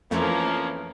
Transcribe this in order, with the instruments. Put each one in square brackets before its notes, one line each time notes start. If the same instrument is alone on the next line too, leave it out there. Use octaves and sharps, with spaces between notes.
[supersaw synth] F2 A3 [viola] E3 C#4 [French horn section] F3 A#3